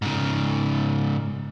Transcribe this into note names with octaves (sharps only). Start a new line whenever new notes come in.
G#2 C#3